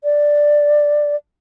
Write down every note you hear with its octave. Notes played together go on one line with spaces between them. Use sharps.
D5